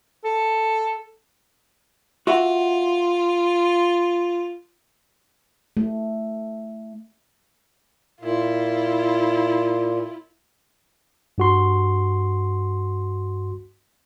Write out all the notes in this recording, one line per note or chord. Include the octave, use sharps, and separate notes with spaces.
A4
F4 F#4 E5 F#5
A3
A#2 E4 F4
G2 F#4 C6